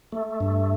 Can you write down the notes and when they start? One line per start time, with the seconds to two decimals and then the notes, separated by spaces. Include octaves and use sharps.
0.12 A3
0.40 G2